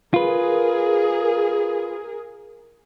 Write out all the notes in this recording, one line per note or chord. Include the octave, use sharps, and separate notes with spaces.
F4 G#4 A#4 B4